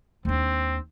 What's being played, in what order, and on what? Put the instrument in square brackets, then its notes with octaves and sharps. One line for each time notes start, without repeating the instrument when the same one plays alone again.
[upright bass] D#2 D4 [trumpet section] C4